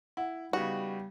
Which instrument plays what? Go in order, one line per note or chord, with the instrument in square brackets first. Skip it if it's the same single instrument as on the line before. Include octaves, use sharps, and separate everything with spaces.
[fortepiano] E4 [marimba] F#5
[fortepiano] C#3 B3 D#4 [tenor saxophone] G3 [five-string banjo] F#4